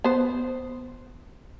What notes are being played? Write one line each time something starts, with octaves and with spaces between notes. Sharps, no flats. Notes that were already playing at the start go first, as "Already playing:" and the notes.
B3 C5